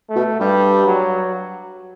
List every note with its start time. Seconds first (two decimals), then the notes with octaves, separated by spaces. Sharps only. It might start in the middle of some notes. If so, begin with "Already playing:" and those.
0.09 A3
0.16 B2
0.39 G2 G3
0.85 F#3